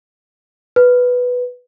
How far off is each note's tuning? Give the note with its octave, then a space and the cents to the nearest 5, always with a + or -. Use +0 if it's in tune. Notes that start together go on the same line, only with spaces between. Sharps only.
B4 +0